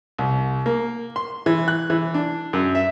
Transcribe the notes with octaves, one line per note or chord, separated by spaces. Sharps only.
C2
A#3
C6
E3
F#6
E3
D4
F#2
E5